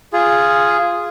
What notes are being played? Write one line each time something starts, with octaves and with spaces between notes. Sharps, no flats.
F4 G#4